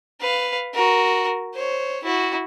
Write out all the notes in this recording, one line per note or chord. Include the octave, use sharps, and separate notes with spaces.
B4 F5
F#4 A#4
C5 C#5
E4 F#4